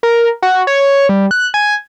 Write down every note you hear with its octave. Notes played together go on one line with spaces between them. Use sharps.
A#4
F#4
C#5
G3
F#6
G#5